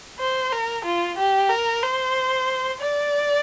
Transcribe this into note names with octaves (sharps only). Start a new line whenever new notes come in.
C5
A#4
F4
G4
A#4
C5
D5